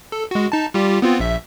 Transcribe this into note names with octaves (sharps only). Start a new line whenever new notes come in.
A4
G#3 F#4
D#4 A5
G3 F4 G4
B3 C4 F4
A#1 E5